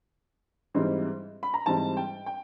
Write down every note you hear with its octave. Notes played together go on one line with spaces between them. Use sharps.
G#2 E3 G3 C4 D#4
B5
A#5
G#2 E3 G3 C4 D#4 A5
G5
G5